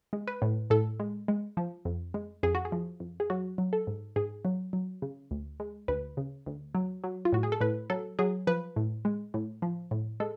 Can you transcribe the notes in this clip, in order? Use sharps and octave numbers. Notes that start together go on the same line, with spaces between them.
G#3
B4
A2
A2 A4
G#3
G#3
F3
F2
G#3
F2 G#4
F#4
G#4
F3
F2
G#4
F#3 F#4
F#3
A4
G#2
G#2 G#4
F#3
F#3
C#3
D2
G#3
D2 B4
C#3
D2
F#3
F#3
F4
A2 F#4
G#4
A4
A2 B4
F#3 A4
F#3 G#4
F3 B4
A2
G#3
A2
F3
A2
G#3 A4